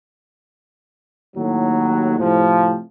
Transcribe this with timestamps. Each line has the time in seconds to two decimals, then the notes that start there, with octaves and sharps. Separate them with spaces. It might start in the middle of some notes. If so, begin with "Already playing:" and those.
1.37 D#2 A2 F#3
2.19 A2 C3 F3